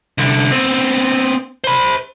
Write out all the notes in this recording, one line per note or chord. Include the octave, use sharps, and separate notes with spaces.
C2 D3
B3 C4
C5 B5